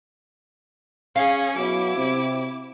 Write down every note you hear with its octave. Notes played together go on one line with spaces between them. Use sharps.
C#4 G#4 F5
B2 F#3 E4 D6
C3